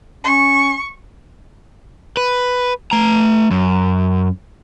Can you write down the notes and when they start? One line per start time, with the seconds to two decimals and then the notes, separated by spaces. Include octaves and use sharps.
0.24 C#4 C#6
2.17 B4
2.91 A3 A#5
3.51 F#2